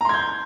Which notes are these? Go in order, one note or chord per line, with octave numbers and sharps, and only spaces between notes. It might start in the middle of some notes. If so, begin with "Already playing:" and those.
A#5 C6 G6 G#6